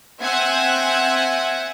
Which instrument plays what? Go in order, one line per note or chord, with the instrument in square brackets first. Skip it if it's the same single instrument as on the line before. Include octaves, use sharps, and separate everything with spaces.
[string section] C4 E5 F#5 G#5